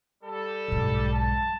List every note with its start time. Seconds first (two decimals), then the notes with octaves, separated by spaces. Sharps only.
0.24 G3 A4
0.68 B1 G#2
1.13 A5